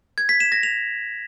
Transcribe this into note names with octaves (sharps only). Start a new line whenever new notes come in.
G#6
B6
E7
A#6
F7